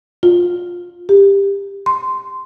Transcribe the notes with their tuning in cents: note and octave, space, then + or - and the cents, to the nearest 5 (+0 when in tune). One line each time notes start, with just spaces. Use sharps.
F4 +15
G4 +20
C6 -10